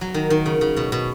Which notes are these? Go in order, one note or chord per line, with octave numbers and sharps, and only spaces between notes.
F#3
D#3
D#3
C#3
C#3
B2
B2